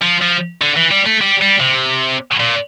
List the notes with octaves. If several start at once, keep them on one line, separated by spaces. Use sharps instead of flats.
F3
F3
D3
E3
G3
A3
G3
G3
C3
A#2